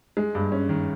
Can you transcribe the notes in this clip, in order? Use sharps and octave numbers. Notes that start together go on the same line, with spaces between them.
G#3
G2
C#4
D#3